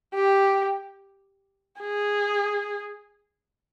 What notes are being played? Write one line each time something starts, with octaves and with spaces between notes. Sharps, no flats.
G4
G#4